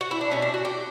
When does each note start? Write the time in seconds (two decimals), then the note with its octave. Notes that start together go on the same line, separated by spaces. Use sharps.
0.01 F#4
0.11 E4
0.21 D4
0.31 B2 A3 C#4
0.42 D4
0.54 F#4
0.65 G4